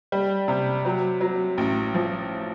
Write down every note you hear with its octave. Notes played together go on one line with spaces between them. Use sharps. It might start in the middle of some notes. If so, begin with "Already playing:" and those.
G3
C3
F#3
F#3
A1
F3